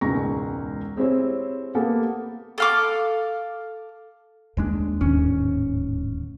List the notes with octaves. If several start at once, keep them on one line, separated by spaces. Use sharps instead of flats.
E1 C#2 G#2 A#5 C#6 A#6
G#3 C4 E4 G4 C5 C#5
A#3 B3 G4 A4 B4
A4 F5 D6
D#2 G#3 D4 F4
D1 D#2 G#2 C#4